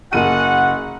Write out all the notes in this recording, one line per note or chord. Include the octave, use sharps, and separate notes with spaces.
F#1 F#4 G#4 F#5 D#7